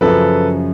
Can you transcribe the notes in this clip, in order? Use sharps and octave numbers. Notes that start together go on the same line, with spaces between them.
F#2 C#3 F3 A4 B4